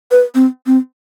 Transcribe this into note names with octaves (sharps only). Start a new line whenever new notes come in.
B4
C4
C4